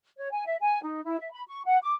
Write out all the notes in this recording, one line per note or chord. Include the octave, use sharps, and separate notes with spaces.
C#5
G#5
E5
G#5
D#4
E4
E5
B5
C#6
F#5
D6